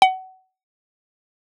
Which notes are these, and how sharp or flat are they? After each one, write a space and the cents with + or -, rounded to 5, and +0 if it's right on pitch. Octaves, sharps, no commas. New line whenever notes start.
F#5 +25